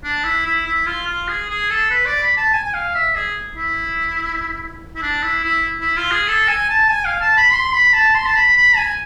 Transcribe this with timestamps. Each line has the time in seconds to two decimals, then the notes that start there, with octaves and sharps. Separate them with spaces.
0.04 D4
0.24 E4
0.46 E4
0.66 E4
0.86 F4
1.07 F4
1.28 G#4
1.50 G#4
1.70 A4
1.90 B4
2.05 D5
2.22 B5
2.37 A5
2.53 G#5
2.64 G#5
2.74 F5
2.95 E5
3.16 G#4
3.56 E4
4.95 E4
5.02 D4
5.23 E4
5.44 E4
5.81 E4
5.97 F4
6.11 G#4
6.27 A4
6.48 G#5
6.69 A5
6.90 G#5
7.05 F5
7.21 A5
7.37 B5
7.52 C6
7.73 B5
7.93 A5
8.14 C6
8.26 A5
8.36 B5
8.56 B5
8.77 G#5